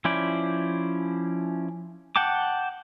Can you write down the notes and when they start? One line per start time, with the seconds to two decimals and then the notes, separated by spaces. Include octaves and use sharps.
0.05 F3 C#4 E4 C5 D5
2.16 F#5 G5 A5 D6